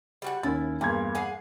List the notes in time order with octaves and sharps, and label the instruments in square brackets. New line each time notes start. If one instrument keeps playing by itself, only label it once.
[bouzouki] G3 F#4 F#5
[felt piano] D#2 C#4 A6 [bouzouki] E4
[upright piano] E2 G2 G#6 [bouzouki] A#2 [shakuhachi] A#3 [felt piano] A5
[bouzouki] G#4 F5 F#5